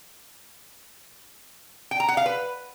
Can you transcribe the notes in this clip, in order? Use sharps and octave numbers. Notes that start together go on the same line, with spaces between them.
G5
A#5
F#5
F5
B4